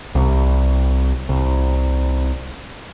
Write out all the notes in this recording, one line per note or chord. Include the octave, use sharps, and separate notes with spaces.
C2
C2